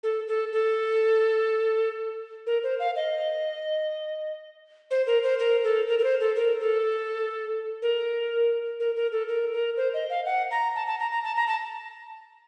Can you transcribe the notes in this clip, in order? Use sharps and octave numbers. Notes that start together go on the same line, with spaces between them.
A4
A4
A4
A#4
C5
F5
D#5
C5
A#4
C5
A#4
A4
A#4
A#4
C5
A4
A#4
A4
A#4
A#4
A#4
A4
A#4
A#4
C5
D#5
F5
F#5
A#5
A5
A5
A#5
A#5
A5
A#5
A5